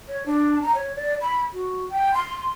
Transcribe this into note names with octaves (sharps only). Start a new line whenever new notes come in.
C#5
D4
A#5
C#5
D5
B5
F#4
G5
C6